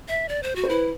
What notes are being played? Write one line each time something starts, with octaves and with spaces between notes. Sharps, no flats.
E5
D5
C5
F#4
C5
E4 B4